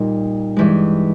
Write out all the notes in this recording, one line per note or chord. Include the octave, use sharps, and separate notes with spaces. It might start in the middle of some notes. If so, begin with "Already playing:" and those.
Already playing: A#2 G3 D#4
G2 E3 G#3